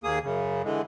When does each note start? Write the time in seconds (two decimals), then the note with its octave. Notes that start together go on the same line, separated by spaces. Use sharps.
0.04 D#2 A#3 G#4 D#6
0.23 F#2 C#3
0.64 D3 E3 G#3